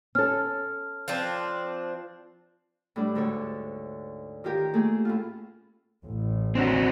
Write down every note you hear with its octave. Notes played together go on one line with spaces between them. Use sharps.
C#4 A4 F6
F3 C4 D4
A2 G3 D4
D2 G#2 D3 A4 C#5
D#3 F4 G4 A#4
A3 A#3 G#4
A2 C#4 F4
A1
C4 D4 F#4